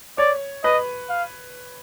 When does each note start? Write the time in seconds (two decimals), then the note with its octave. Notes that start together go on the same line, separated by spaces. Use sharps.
0.18 C#5 D5
0.64 B4 D#5
1.10 F5